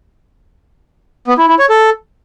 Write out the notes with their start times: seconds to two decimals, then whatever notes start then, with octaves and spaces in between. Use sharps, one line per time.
1.27 B3
1.38 E4
1.48 E4
1.59 C#5
1.69 A4